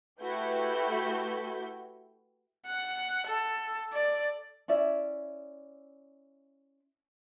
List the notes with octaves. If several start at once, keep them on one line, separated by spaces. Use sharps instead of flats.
A3 E4 F#4 G4 B4 G6
F#5
A4
D5
C#4 E4 D5 E5